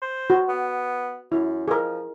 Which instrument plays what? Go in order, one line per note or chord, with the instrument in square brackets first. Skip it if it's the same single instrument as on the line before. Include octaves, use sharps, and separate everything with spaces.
[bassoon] C5
[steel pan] F#4
[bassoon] B3
[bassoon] F#2 [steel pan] E4
[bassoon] F3 [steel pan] G#4 A#4